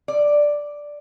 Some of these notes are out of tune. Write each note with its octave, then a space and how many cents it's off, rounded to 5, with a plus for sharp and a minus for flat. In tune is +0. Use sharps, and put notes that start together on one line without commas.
D5 +0